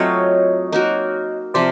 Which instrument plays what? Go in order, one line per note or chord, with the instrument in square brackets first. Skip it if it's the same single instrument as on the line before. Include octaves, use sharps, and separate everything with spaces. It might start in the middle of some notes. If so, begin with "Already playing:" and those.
Already playing: [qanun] F#3 A3 C4 F4 [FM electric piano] C#5 D#5
[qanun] A#3 D#4 F#4 A#4
[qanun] C3 F3 [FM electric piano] C5 D5